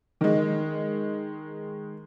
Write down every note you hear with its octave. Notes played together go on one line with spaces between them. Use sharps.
D#3 G#3